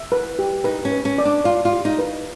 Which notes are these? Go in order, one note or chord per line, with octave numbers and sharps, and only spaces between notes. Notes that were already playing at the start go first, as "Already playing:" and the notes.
Already playing: E5
B4
G4
D#4 B4
C#4
B4
C#4
D5
D4
F4 D5
F4
G4
D#4
B4